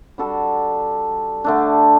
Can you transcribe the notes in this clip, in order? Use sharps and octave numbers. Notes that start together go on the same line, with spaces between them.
G3 D4 F#4 A4
D3 A3 D4